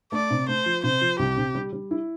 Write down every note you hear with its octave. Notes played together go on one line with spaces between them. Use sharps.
A3 D5
C3
A3 C5
F3
C3 C5
F3
C2 G4
C3
G3
G3
E4